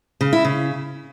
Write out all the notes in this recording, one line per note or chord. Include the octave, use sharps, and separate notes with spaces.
C#3
E4
C#3